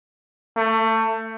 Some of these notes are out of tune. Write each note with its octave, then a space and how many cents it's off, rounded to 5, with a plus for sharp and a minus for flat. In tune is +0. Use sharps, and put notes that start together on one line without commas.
A3 +25